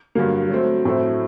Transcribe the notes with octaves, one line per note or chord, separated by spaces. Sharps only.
G2 D3 F#3 A#3
F#3 A3 C4
A2 F#3 A3 C4 E4